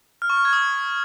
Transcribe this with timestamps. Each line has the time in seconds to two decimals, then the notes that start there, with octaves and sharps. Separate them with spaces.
0.22 F6
0.30 C#6
0.37 F6
0.45 G#6
0.53 D#6